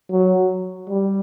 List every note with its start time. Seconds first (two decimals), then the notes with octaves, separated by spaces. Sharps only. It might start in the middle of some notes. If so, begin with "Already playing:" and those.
0.11 F#3
0.90 G3